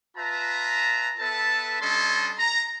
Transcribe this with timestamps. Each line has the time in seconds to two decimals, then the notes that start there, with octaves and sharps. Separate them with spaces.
0.17 F4 B4 E5 A5 A#5
1.19 B3 A4 B4 E5 A5
1.80 G3 C#4 D4 A4 D#5 C6
2.38 A#5